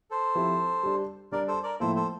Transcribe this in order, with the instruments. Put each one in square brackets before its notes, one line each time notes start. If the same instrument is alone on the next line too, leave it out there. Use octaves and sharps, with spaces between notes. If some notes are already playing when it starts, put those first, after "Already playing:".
[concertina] A4 C5
[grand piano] F3 C4 E4 G4
G3 D4 G4
[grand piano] G3 D4 G4 [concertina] A#4 D5
[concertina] A4 C5
A#4 D5
[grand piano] A2 F3 A#3 E4 [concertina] A4 C5
[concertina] A4 C5